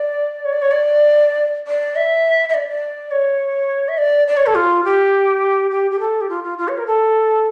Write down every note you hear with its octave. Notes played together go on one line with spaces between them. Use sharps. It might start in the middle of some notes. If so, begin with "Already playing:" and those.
Already playing: D5
C#5
D5
C#5
D5
D5
E5
E5
D5
D5
C#5
E5
D5
D5
C#5
A4
F4
G4
G4
G4
A4
G4
F4
F4
F4
C#5
A#4
A4